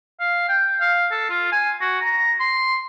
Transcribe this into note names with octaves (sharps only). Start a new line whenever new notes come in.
F5
G5
F5
A4
F4
G#5
F#4
A#5
C6